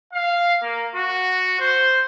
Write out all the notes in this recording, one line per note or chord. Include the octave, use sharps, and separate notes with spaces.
F5
A#3
F#4
C5